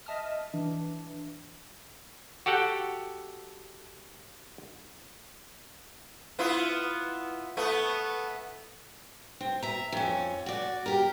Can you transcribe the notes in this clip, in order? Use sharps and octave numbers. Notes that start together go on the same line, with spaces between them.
D#5 E5 A5 D#6 F6
E3 D4
F#4 G4 A4 F#5 G5
B3 E4 F4
A3 B3
C4
E5 A#5
F2 C#4
F#4 D5
G4 A#4